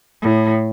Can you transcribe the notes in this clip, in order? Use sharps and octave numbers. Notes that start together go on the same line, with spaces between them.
A2